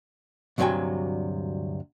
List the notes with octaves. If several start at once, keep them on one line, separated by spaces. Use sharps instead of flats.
D2 G2 C3 F#3 G5 G#5